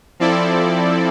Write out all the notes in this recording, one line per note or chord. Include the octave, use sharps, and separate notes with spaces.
F3 C4 E4 A4 D5